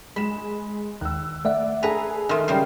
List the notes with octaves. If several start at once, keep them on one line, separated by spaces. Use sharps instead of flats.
G#3 B5 E7
D#2 D#3 E6 F#6
A3 D5 E5 F#5
G#4 A4 B4 G#5 A#5
D#3 A3 C6 D#6 F6
C#3 G3 G#3 C5 F6 C7